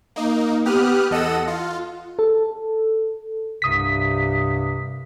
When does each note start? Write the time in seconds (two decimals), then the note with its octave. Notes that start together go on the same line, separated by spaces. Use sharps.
0.16 A#3 D#4
0.65 B3 G4 D#6 F6 F#6
1.11 E2 A4 D#5 F#5 E6 D#7
1.48 F4
2.19 A4
3.62 C2 G2 C3 D#6 B6